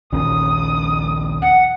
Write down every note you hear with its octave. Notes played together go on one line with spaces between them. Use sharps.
A#1 D#2 C#4 D#6
F#5